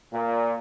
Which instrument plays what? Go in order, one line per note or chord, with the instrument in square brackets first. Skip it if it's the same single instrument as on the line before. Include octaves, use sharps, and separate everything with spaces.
[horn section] A#2